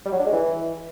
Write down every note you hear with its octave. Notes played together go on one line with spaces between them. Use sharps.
G3
F#3
D4
G#3
E3